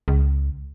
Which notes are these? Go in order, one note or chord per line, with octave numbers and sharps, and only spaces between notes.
C#2